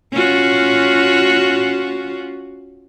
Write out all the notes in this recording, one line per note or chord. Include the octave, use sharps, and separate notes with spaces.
C#4 F4 F#4